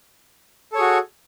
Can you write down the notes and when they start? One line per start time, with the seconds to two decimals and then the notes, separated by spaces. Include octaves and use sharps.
0.72 A4
0.75 C#5
0.78 G#4
0.80 F#4